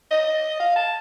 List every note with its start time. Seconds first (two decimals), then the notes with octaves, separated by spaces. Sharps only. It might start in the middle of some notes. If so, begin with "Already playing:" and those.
0.11 D#5
0.60 F5
0.76 A5